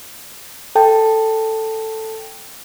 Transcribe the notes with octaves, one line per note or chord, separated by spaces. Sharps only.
A4 G5 A5